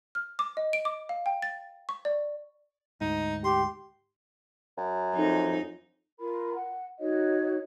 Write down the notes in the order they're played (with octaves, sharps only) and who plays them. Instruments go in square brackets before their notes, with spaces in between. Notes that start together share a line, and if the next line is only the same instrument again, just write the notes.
[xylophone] F6
D6
D#5
D7
D6
F5
G5
A6
C#6
D5
[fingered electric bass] D2 G#2 [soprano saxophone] D#4
[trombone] G4 [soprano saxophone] C6
[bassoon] F#2
[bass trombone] F2 [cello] D#4
[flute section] F4 A#4 B5
F#5
D#4 F#4 C#5 D#5